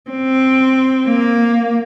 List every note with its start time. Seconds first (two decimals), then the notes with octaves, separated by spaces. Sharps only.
0.10 C4
1.07 A#3